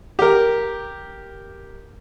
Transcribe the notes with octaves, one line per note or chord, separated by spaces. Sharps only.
G4 A#4